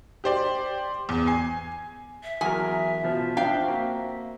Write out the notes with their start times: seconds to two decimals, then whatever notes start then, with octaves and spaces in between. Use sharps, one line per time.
0.24 G4 C5 D5
1.09 E2
1.27 G#5 C7
2.24 E5
2.41 E2 F#3 A#4 G#5
3.03 B2 F3
3.37 F3 C4 D4 F5 G5
3.64 A#3 C4 F#4